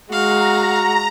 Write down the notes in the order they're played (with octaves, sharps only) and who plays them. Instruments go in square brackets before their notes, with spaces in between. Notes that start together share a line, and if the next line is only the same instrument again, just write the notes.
[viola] G#3 [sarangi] F#4 [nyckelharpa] F5 [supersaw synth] A#5